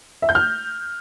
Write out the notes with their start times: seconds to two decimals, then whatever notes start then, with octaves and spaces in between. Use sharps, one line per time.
0.22 E5
0.29 G6
0.35 F6